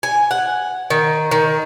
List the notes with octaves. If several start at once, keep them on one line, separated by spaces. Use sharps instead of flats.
G#5
F#5
D#3
D#3